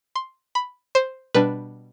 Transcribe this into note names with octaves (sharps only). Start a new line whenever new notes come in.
C6
B5
C5
B2 G3 D4 B4